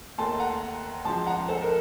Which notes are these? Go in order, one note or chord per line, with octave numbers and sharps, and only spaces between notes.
D#2 D#3 A3 A5 C6
F#5 A#5
C#2 C#3 F3 A5 C6
F#5 A#5
A4 C5
A#4